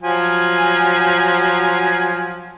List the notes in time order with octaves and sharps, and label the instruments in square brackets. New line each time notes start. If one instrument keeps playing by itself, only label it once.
[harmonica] F3 F#3 G#5